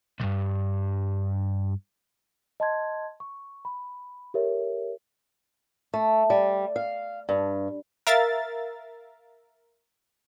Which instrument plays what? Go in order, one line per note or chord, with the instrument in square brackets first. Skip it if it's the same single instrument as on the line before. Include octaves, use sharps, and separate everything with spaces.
[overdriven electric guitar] C2 G2
[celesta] D#5 A5 C6 G#6
C#6
B5
G4 A4 A#4 C#5 E5
[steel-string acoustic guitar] A3
G3
F5
G2
[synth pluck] A#4 E5 F5 A6